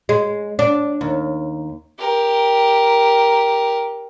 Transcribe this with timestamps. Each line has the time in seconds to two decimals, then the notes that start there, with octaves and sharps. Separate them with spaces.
0.09 G#3
0.59 D4
1.01 D#2
1.99 G4 A#4